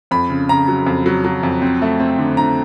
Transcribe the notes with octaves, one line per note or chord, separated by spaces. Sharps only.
F2 B5
C#3
C#3 A#5
F#3
F2
F#3
F#3
F2
C4
A3
C4
D3
D3 A#5